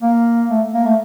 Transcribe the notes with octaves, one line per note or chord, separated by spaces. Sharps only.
A#3
A3
A#3
A3